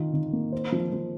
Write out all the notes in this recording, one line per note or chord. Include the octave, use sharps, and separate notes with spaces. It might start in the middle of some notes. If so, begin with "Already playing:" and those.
Already playing: D#3 F4
D#3
A#3
C5
F3
F3